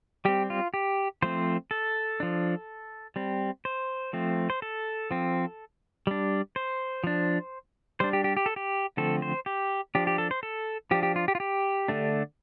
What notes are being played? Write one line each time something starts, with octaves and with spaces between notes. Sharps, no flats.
G3 C4 G4
F4
G4
F3 A3 C4 C5
A4
F3 D4
G3 C4
C5
F3 A3 C4
C5
A4
F3 C4
G3 D4
C5
F3 D4
G3 D4 C5
G4
G4
G4
A4
G4
D3 F3 A3 C4 A4
C5
G4
F3 D4 G4
G4
A4
C5
A4
F3 D4 G4
G4
F4
G4
F4
G4
D3 A3 D4